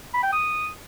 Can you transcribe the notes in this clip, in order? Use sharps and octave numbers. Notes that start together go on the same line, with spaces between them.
B5
G5
D#6